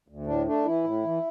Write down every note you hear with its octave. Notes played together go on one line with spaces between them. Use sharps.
D2
A2 D4
A3 D4
E3 E4
A2
E3